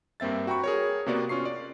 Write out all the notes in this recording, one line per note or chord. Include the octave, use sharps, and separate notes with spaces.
G2 A#3 C4 E5 A6
F#4 G5 A#5 B5 C#6
G#4 A#4 C#5
C3 A#3 B3 F#4 D5
C#4 F4 C#6 C7
D5